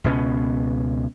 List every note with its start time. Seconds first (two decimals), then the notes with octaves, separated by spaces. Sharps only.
0.04 C#2 B2 B3 C#4